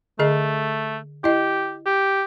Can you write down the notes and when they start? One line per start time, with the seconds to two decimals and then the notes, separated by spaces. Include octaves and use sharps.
0.19 D3 A3 G#4 D#5
1.24 E4 G4 D#5
1.86 G4